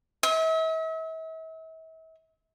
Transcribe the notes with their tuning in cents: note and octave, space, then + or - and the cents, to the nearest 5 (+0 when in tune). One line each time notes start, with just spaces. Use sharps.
E5 -40